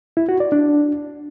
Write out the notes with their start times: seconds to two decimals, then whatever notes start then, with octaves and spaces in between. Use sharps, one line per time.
0.17 E4
0.29 F#4
0.40 D5
0.52 D4